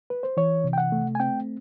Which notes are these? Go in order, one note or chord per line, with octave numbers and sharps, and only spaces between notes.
B4
C5
E3 C#5
C3
G5
F#5
A3
G#5
C4 G5